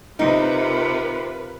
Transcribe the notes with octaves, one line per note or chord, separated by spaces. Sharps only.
C3 D#4 F4 A#4 B4